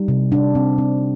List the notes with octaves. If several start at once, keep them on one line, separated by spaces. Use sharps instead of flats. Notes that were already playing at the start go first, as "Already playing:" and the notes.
Already playing: G3 D#4
C3
D4
C4
C4